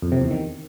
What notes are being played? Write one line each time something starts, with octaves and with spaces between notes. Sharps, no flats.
F2
C3
E2
D#3